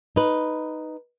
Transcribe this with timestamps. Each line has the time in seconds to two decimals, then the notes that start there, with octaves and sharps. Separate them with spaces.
0.16 D#4 B4